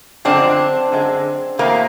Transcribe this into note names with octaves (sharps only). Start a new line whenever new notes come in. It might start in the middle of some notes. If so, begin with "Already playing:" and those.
F#2 D3 F3 G#3 C4 D4
F#2 D3 G#3
E2 B2 F#3 A3 A#3 C4